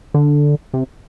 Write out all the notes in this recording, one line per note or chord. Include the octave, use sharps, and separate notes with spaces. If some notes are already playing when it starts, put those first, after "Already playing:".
D3
C3